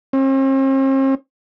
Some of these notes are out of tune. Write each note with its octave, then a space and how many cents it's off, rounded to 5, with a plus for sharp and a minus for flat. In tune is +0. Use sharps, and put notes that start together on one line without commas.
C4 +45